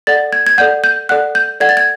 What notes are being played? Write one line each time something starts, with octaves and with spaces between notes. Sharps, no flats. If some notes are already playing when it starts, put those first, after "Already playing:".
A4 D5 F#5 A6
G#6
G#6
A4 D5 F#5 G6
G6
A4 D5 F#5 F#6
G6
A4 D5 F#5 G#6
A6
G#6